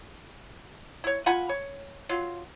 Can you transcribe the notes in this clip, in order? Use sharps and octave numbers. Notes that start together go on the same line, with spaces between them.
E4 C#5
F4 F#5 G#5 B5
C#5
F#3 F4